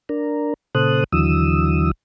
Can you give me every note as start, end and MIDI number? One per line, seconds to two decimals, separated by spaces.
0.09 0.54 62
0.09 0.54 70
0.75 1.04 46
0.75 1.04 49
0.75 1.04 69
0.75 1.04 72
0.75 1.04 87
0.75 1.04 90
1.12 1.91 39
1.12 1.91 50
1.12 1.91 52
1.12 1.91 54
1.12 1.91 87
1.12 1.91 88